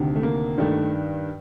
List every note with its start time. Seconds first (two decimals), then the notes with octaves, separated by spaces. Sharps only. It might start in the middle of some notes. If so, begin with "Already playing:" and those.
Already playing: D2 C3 D#3
0.15 A3
0.23 A#3
0.58 G2 D#3 A3